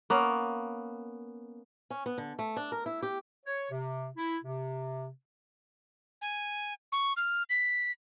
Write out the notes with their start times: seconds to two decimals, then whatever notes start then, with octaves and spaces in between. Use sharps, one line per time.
0.10 A#3 B3 C#4
1.90 C#4
2.06 B3
2.18 D3
2.39 A3
2.56 D4
2.72 A#4
2.86 E4
3.02 G4
3.45 C#5
3.71 C3
4.16 E4
4.44 C3
6.22 G#5
6.92 C#6
7.17 F6
7.50 B6